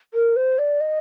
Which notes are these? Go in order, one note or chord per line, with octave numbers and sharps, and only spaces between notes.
A#4
C5
D5
D#5